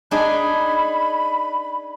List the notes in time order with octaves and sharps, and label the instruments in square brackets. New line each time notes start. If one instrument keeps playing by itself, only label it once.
[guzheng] D4 D#4 G#4 [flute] B5